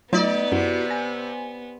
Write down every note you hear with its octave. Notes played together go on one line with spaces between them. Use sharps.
F#3 A3 B3 D#4 F4 D5
F#2 C3 E4 F#4
G#5 A#6